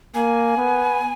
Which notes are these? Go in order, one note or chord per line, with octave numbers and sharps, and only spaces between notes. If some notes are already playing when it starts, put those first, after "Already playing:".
A#3 G#5
B3